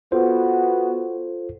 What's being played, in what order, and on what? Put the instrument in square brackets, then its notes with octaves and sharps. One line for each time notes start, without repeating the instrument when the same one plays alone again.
[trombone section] B3 F#4 [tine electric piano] F4 A4 C5